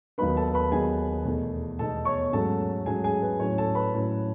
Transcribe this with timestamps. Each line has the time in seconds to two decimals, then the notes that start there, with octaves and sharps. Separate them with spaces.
0.18 D#2 D#3 F#3 B3 D#4 B4 B5
0.36 A4 A5
0.47 A5
0.54 B4 B5
0.71 D#2 D#3 F#3 B3 D#4 G#4 G#5
1.25 E2 B2 A3 D#4
1.79 E2 B2 A3 D#4 A4 A5
2.05 C#5 C#6
2.32 G#2 F#3 A3 C#4 A4 A5
2.86 G#2 F#3 A3 C#4 G#4 G#5
3.03 G#4 G#5
3.22 B4
3.40 A2 F#3 C#4 C#5
3.58 A4 A5
3.75 B4 B5
3.93 A2 F#3 C#4